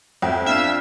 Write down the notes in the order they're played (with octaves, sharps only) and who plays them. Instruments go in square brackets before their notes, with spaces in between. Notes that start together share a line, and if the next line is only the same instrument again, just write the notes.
[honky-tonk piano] F2 [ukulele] E5 G5
[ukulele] D4 F4 [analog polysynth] E5 E6 [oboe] F5